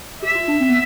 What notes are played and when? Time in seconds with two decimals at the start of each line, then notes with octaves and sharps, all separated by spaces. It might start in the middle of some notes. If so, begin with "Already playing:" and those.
0.22 G4 E5
0.35 F4
0.48 D4
0.60 C4
0.70 B3